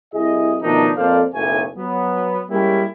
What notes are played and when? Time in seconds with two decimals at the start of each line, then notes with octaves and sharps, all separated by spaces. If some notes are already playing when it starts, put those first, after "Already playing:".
0.14 C2 E4 G#4 D#5
0.62 B2 D#3 F3 A3 D4 D#4
0.97 F2 A#3 A4 C5 D5 F5
1.34 F#1 B1 A2 A3 G#5
1.77 F#3 B3
2.50 G3 G#3 A#3 C#4 E4 G4